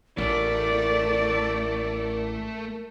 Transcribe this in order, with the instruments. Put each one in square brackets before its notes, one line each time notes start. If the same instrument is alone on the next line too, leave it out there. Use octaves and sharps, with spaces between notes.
[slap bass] A1 [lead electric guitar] A3 [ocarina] A#4 [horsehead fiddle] D5